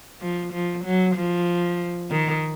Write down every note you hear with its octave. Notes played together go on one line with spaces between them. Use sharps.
F3
F3
F#3
F3
D#3